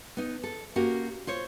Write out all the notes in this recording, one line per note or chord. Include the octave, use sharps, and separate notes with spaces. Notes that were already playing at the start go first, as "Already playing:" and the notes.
B3 D#4
A4
A#3 C#4 F#4 G4 A#4
F4 C5 C#5